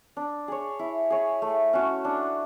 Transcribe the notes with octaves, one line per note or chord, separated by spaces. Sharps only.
D4
G#4 C#5
E4
G#4 C#5
A3
C#4 F#4
D4